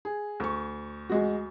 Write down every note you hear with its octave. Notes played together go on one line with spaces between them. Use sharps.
G#4
D2 C#6
G#3 F#4